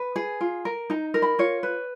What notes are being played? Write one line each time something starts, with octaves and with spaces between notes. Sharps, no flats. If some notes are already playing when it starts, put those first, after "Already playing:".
Already playing: B4
G#4
F4
A#4
D#4 A#5
A#4
B5
F4 C#5
B4